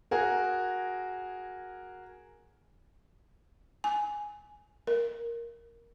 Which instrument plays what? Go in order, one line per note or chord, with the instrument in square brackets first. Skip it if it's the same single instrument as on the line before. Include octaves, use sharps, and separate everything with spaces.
[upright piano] F#4 G#4 A#4
[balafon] G#5
A#4